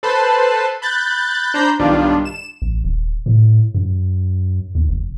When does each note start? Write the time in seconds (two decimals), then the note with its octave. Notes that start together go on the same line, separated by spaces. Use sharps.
0.03 A4 B4 C5 A5 B5 C6
0.82 B5 F#6 G6 A6
1.54 D4 C5 A#5 B5 G6
1.80 B1 G2 D#3 G3 D4 F4
2.25 E7
2.62 A1
2.84 D#1
3.26 A2
3.75 F#2
4.75 D#2
4.89 F1